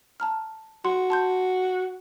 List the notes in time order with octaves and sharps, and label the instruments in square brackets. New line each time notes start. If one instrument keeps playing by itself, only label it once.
[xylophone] A5 A#5 F6
[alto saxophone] F#4 [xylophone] C6
[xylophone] A5 C6 G6